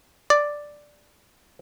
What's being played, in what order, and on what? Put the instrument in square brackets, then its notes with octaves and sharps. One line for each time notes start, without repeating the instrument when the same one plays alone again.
[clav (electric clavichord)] D5